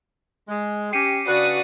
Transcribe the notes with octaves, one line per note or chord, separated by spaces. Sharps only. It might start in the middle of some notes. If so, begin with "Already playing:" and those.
G#3
C#4 G4 C7 C#7 D#7
C#3 D4 F#4 B4 D5 D#6